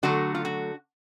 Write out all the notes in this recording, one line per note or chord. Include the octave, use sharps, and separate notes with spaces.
D3 F#3 A3 F#4
F4
F#4